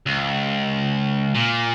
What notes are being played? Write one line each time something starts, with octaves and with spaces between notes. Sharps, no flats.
C#2
A#2